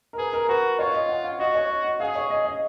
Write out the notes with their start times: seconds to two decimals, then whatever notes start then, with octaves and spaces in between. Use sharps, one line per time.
0.13 A#4
0.18 G#4 B4
0.33 A#4
0.49 F#4 B4
0.79 F4 C#5
0.94 D#5
1.09 F#5
1.24 F5
1.39 F#4 D#5
1.55 C#5
1.70 D#5
1.85 D#5
2.00 G#4 F5
2.15 C#5
2.30 D#5
2.45 D#5